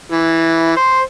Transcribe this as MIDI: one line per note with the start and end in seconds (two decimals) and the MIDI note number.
0.11 0.75 52
0.76 0.99 72